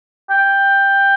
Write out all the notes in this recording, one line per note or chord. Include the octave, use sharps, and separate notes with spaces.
G5